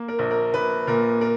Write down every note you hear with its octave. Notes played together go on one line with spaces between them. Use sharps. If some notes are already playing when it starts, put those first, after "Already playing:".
Already playing: A#3
A#4
A#1
A#4
A#1 B4
A#2 A#4
A#4